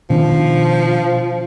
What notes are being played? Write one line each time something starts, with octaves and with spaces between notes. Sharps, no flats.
B2 D#3 F3 D4